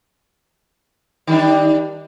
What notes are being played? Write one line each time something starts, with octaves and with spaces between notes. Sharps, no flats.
D#3 G3 D4